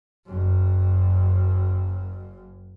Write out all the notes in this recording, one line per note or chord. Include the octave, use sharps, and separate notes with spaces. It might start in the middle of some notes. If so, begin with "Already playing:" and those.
F#1 F#2